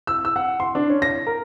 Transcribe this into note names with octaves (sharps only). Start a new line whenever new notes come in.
E6
E6
F#5
C6
D4
C#4
A#6
A#4